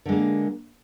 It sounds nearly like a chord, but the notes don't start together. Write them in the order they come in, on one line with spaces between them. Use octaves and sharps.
D3 G#3 A#3